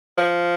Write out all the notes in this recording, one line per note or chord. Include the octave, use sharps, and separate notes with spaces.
F3